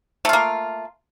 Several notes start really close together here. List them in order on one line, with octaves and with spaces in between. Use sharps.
A3 F4 A#3